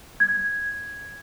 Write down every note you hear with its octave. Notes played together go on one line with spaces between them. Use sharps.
G#6